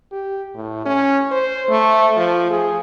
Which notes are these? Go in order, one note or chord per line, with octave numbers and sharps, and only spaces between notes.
G4
A2
C#4
C5
A3
F3
G#4